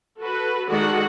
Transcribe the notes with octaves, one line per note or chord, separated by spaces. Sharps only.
F#4 A4 B4
D#3 G#3 F#4 A4 D5 F#5